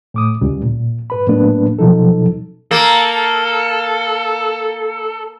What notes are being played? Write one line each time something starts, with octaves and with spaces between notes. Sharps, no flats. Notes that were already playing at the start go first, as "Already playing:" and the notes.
A2 D6 D#6
C#2 G3
A#2
G#2 B4 B5
A2 F#3 A#3 B3 D4 B4
B2 F3 F#3 D#4 A4
A#3 A4